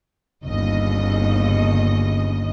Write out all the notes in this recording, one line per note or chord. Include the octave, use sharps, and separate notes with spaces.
G1 D#2 C#3 D#5